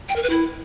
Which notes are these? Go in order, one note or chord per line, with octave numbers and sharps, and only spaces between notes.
G5
A#4
B4
E4